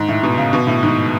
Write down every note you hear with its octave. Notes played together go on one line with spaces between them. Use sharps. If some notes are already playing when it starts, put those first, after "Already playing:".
Already playing: G#2
A2
B2
C#3
B2
A2
G#2